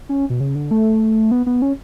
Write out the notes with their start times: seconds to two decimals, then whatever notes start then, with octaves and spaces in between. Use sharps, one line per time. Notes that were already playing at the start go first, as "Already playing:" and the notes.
0.09 C#4
0.30 B2
0.40 C#3
0.55 D3
0.71 A3
1.31 B3
1.46 B3
1.62 C#4